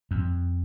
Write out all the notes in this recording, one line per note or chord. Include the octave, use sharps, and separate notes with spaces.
F2